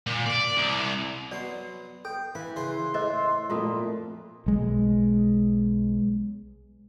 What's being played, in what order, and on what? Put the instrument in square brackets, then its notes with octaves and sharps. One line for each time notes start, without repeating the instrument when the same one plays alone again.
[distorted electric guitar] A#2
D5
C2
[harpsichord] F#3 B3 C6 [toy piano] D5
[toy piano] A4 [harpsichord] G5
[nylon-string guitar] E3 [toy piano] F5 [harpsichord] B5
[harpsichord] C#3 B4 G#5 [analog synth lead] C6
[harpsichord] A2 [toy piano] G#4 C5 D#5 [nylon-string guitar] E5
[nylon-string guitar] F2 A#2 A3 [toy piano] F4 F#4 D#6
[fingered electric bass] B1 G#3